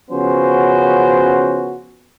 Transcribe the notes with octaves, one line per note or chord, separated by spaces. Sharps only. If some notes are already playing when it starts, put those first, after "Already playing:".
C#3 F3 B3 C#4 F#4 C5